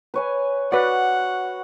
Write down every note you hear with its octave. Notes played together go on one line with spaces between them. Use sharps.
B4 C#5 G#5
F#4 B4 D5 F#5